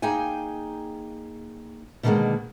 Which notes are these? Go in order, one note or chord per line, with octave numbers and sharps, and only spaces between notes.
A#3 D#4 G#4 G5 G#5
B2 D3 D#3 F#3 G#3 A#3